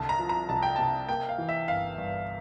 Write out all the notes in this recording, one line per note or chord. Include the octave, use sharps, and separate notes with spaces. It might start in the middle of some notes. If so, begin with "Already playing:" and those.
Already playing: C2 D3 A5
A#5
F3
A#5
C2 A5
G5
C3 A5
A#3 G5
F5
E3
E5
G1 F5
G2